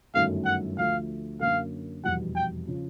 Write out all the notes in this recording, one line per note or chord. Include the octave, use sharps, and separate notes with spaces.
G1 F#2 D#3 F#3 A3 F5
F#5
D2 D3 F3 A3 F5
F#2 D3 F#3 A#3 F5
F1 E2 B2 G3 F#5
G5
C#3 F3